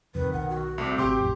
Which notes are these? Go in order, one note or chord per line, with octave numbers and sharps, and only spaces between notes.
F2 C3 D#3 B4
B1 F#5
F#4
C2 A3 C4 D6
G#1 C3 G4 C6 D6
A1 F2 A2